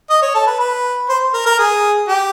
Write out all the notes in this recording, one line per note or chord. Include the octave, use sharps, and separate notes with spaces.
D#5
C#5
A4
B4
B4
C5
A#4
A#4
G#4
G4